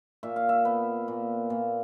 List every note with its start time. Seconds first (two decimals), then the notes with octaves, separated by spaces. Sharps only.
0.23 A#2 E5
0.36 F5
0.49 E5
0.65 B3
1.08 A#2
1.50 A#2